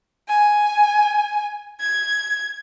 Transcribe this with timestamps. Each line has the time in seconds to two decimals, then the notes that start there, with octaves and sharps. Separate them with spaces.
0.28 G#5
1.80 G#6